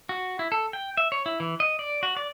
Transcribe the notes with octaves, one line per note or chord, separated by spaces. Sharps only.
F#4
E4
A4
G5
E5
C#5
E4
E3
D#5
D5
F#4
D5